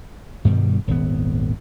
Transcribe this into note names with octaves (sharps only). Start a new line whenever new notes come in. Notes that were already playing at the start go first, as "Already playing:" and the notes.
G2 B2 D#3 G3
D#1 G#1 B3